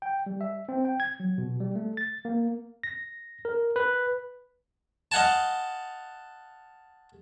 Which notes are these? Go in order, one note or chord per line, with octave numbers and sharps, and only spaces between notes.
G5
G3
E5
C4
G5
G#6
F#3
B2
G3
A3
A6
A#3
A#6
A#4
B4
D#5 F5 F#5 G#5 A5